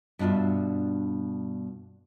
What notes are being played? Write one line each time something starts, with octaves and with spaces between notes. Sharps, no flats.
G2 B2 D4 F4 E5